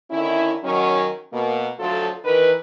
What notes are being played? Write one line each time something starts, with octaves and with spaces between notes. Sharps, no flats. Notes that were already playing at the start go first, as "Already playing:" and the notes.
D3 D#3 C#4 E4
D#3 F#3 C#4
B2 A#3
D2 F3 F#3 A3 F4 A4
D#3 E3 A#4 B4